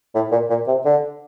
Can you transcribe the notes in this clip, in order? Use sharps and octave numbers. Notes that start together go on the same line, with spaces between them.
A2
A#2
A#2
C3
D3